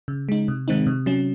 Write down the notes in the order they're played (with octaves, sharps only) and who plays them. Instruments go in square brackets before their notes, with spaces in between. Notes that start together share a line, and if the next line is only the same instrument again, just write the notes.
[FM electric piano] C#3
G#3 D#4
C3
D#3 G#3 C4 D#4
C3
F#3 C#4